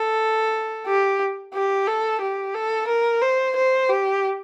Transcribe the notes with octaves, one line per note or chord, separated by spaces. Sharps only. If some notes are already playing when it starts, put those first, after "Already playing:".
Already playing: A4
G4
G4
A4
G4
A4
A#4
C5
C5
G4